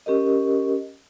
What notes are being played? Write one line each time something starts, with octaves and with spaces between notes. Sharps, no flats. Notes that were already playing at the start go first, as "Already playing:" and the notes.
C#4 G4 A#4 D#5